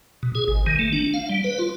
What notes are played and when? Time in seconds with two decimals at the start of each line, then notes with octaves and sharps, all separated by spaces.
0.23 B2
0.35 G#4
0.48 G#1
0.67 D#3
0.79 A3
0.93 D4
1.14 F5
1.30 G3
1.44 B4
1.59 F4